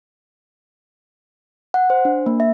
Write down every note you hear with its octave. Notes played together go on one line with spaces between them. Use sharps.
F#5
C5
D4
A#3
E5